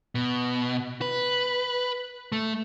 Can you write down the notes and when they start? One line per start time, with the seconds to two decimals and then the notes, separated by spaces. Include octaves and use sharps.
0.15 B2
1.01 B4
2.32 A3